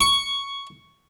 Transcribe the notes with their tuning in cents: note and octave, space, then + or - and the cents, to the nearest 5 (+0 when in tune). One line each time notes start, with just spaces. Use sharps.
C#6 +5